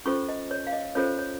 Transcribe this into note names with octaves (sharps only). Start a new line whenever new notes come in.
C#4 F4 A4 C5 C#6
D#5
C#5
F5
D#5
C#4 F4 A4 C5 C#5
C#5